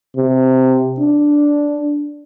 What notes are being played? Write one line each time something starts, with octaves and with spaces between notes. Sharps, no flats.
C3
D4